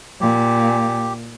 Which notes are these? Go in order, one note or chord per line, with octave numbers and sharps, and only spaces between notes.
A#2 G4